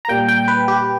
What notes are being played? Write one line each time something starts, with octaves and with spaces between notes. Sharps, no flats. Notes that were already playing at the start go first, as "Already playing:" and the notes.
A#5
A#2 G3 A#3 G5
G5
B4
G4